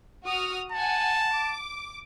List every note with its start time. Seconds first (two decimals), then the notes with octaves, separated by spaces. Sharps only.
0.25 F#4 D#6 F6
0.72 F#5 G#5 A5
1.33 D6